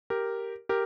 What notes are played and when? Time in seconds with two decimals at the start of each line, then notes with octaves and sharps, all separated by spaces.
0.10 G4 A#4
0.69 G4 A#4